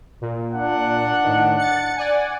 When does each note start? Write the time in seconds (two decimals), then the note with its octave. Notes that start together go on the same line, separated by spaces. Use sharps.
0.21 A#2
0.54 D4 F#5
1.24 A2 D#3
1.58 A6 C#7
1.96 D5 F#5 G#5